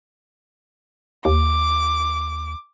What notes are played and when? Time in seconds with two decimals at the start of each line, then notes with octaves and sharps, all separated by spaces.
1.25 D#2 D6